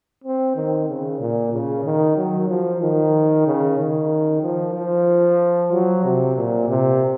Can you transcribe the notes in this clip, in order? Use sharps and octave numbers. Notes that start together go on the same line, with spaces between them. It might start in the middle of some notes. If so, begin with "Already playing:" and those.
C4
D#3
C#3
A#2
C#3
D#3
F#3
F3
D#3
C#3
D#3
F3
F3
F#3
C3
A#2
C3